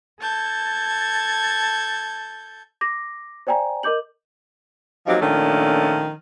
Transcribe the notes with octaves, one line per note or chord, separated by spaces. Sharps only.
A4 A5 G6 G#6
D6 A#6
C5 D5 G5 G#5 A#5
A#4 D#5 D6 G6 F#7
F3 F#3 A#3 C4 D#4 G4
A#2 D#3 F3 A3 C#4 D4